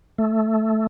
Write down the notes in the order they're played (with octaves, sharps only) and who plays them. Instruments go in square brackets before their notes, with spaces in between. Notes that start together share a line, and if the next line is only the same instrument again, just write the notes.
[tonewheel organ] A3